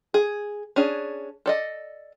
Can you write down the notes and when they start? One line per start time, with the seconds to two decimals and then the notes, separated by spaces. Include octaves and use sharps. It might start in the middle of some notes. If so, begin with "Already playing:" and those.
0.14 G#4
0.76 C#4 D4 G#4
1.46 A4 D5 D#5